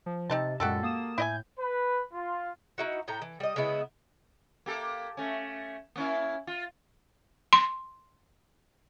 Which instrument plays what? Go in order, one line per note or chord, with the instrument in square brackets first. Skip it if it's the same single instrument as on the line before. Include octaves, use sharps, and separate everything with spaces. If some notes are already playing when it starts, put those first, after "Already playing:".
[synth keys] F3
[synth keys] C3 [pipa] C4 D#4 A5
[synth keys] F#2 A#2 G#3 [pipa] F#4 G4 A4
[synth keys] A#3 D#6 E7
[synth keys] A2 G6 [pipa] E4 D#5 G#5
[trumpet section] B4
F4
[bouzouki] D#4 E4 F#4
A2 A3 G5 A#5
E3
G3 D#5
C#3 G#3 B3 E4
[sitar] A#3 G4 A4
A3 C#4
A#3 C#4 E4
F4
[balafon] C6